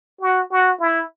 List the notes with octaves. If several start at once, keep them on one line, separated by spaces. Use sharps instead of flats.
F#4
F#4
E4